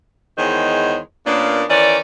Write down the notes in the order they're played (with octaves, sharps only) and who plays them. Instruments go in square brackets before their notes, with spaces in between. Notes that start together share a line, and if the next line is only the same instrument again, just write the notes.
[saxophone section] E2 D#3 G#3 C5 C#5
A#2 A#3 B3 C#4 D4
D#3 E3 C#4 D5